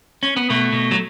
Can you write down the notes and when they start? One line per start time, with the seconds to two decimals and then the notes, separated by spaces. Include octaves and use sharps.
0.23 C#4
0.36 B3
0.50 B2 A3
0.73 B2
0.91 F#3